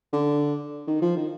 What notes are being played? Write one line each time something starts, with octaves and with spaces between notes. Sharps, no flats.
D3
D#3
F3
D#3